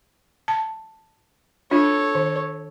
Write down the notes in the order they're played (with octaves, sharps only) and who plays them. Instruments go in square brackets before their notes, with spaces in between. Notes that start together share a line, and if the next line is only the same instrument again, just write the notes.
[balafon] A5
[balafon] D4 F4 [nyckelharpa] A4 C#5
[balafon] D#3